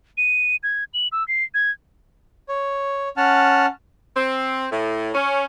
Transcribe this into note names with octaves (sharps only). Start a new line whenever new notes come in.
D#7
G#6
F#7
E6
C7
G#6
C#5
C#4 F#5 A5 F6
C4
A2
C#4